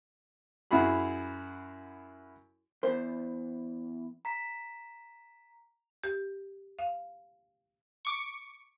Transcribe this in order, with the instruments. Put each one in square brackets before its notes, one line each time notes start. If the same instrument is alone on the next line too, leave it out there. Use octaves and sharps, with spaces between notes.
[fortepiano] F#2 E4 F#4 G#4 B5
[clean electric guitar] E2 [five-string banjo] C5
[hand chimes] A#5 B6
[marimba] G4
F5
[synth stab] C#6 D6